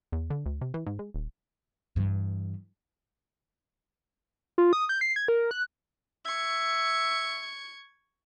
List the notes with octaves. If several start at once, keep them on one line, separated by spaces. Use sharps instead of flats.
E2
D3
D2
C3
E3
G#2
G#3
D#1
G2 E3
F4
D#6
G6
C7
G#6
A#4
F#6
E5 C#6 G#6